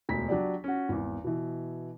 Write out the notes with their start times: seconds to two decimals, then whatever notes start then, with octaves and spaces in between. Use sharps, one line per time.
0.09 E1 D2 B6
0.28 F#3 D4 G4 D5
0.64 C#4 F#4
0.89 G#1 E2
1.24 B2 E3